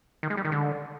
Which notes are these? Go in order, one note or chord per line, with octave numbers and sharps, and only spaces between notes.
D#3
G#3
G3
D#3
D3